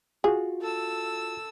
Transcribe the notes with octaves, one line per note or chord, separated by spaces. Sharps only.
F4 F#4 G#4
A4 E6